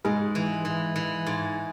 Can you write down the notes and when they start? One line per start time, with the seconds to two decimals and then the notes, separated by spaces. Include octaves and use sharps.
0.05 G#2 G#3
0.35 E3
0.65 E3
0.96 E3
1.27 G#2